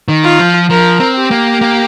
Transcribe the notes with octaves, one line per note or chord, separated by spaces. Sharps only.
D#3
F4
F3
F3 A#4
C4
G4
A#3
A#3